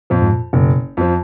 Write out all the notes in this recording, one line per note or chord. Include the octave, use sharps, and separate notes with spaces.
F2 A#2 F3
G#2
A#2
F#1 B2
F2 F3